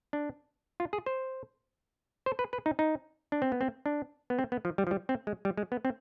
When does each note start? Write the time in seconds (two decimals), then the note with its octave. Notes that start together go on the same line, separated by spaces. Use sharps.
0.13 D4
0.80 F4
0.93 G#4
1.06 C5
2.26 C5
2.39 B4
2.53 B4
2.66 D#4
2.79 D#4
3.32 D4
3.42 C4
3.52 B3
3.61 C4
3.86 D4
4.30 B3
4.39 C4
4.52 B3
4.65 F3
4.78 G3
4.87 F3
4.91 G3
5.09 C4
5.27 G#3
5.45 G3
5.57 G#3
5.72 B3
5.85 C4